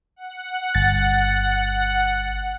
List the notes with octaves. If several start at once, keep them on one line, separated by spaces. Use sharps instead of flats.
F#5
G1 A6